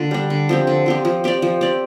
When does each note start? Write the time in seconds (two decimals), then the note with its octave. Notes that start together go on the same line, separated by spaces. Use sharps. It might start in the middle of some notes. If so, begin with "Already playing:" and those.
Already playing: D3 A#3 F4
0.11 G3 D4
0.30 D3
0.49 F3 C4 G4
0.67 D3
0.86 F3 C4 G4
1.05 F3
1.24 C4 G4 D5
1.42 F3
1.61 C4 G4 D5